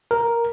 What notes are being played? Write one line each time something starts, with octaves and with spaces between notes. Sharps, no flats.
A#4